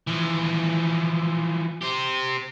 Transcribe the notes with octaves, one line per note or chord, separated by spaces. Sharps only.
E3 F3
C4 G4